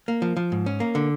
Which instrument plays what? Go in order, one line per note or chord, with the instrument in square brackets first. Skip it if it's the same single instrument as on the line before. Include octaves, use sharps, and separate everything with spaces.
[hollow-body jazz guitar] A#3
F3
F3
G#2
C#4
A#3
D3